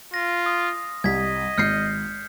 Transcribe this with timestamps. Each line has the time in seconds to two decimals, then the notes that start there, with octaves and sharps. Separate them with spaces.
0.14 F4 A#6
0.46 D#6
1.04 C2 D#5 G#6 B6
1.58 G#1 F6 G6 C7 C#7